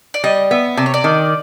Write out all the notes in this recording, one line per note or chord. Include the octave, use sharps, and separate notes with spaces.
D5
G3 D#5
B3 E5
C3 D5
C#5
D5
D#3